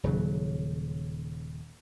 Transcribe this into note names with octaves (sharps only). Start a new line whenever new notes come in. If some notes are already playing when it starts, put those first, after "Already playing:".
D#1 C#3 F#3